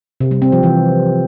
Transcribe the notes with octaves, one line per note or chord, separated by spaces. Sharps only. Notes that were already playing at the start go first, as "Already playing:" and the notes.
C3
G3
C4
F3
E3